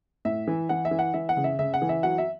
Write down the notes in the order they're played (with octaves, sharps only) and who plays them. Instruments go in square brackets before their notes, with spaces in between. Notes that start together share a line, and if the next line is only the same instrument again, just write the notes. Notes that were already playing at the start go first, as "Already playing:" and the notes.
[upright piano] A2 E5
E3
E3 F#5
E5
E3
F#5
E3 E5
F#5
C#3
E5
C#3 E5
F#5
E3
E5
F#3 F#5
E5